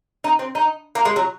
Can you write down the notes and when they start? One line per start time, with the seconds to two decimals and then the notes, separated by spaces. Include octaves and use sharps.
0.24 D#4
0.39 C4
0.55 D#4
0.95 A#3
1.05 G#3
1.16 F#3